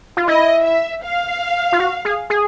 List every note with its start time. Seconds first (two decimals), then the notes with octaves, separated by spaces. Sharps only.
0.17 F4
0.28 E4 D#5
0.65 E5
1.04 F5
1.72 F4
1.80 F#4
2.05 G#4
2.30 G#4